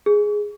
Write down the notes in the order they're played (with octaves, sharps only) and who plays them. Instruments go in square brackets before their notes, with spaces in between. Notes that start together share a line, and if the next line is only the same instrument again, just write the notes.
[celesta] G#4